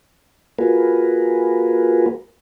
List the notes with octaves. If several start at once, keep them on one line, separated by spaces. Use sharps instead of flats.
A#3 F4 F#4 G#4 A#4 B4